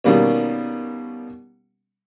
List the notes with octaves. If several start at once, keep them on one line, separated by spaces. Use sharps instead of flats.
B2 D#3 G3 A#3 C#4